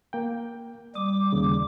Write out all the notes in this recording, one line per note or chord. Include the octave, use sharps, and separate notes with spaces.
A#3 G5
G3 D6 D#6
D#2 C#3